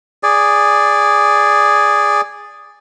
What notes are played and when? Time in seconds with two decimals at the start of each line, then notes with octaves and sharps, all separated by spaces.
0.23 G#4 D5